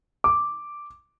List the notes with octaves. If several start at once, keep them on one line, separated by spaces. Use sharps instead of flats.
D6